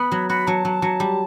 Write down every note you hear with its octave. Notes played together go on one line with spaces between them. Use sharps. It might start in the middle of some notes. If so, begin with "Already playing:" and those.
Already playing: B3 B5
F#3
F#4 B5
F#3 A5
F#3
F#3
G3